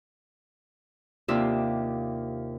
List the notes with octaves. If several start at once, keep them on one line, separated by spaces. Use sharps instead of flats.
D#2 C3 D4 F4 E5 E6